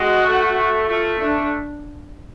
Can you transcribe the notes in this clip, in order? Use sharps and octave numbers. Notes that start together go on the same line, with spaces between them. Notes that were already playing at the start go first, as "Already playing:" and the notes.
Already playing: G#3 F#4
A3
A3 F4
A3 D4